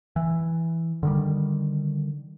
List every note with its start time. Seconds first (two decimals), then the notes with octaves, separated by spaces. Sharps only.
0.16 E3
1.03 D3 D#3 G3